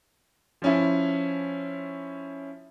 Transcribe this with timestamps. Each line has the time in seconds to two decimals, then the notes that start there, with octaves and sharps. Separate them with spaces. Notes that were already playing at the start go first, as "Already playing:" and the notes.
0.62 F3 C#4 E4